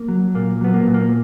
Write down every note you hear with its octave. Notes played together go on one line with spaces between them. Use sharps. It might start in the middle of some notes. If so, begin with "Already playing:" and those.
Already playing: A#3
F#3
A#2 A#3
F#3 B3
A#3
A#2
A#3